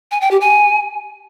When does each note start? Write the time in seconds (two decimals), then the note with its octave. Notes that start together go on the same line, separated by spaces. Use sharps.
0.11 G#5
0.21 G5
0.31 G4
0.41 G#5